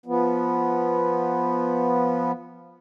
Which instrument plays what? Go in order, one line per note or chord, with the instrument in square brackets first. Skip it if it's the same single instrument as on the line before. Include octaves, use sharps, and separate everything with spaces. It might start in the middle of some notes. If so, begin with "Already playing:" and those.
[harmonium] F3 B3